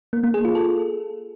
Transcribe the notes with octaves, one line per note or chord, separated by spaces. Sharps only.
A#3
A#3
G#4
F4
A4